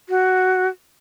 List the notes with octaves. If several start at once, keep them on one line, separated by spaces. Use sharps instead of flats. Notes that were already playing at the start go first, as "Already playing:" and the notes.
F#4